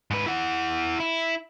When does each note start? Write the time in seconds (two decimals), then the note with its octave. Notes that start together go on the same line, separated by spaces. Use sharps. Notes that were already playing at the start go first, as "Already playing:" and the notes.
0.11 G#2 B4
0.26 E4 F#5
1.00 E4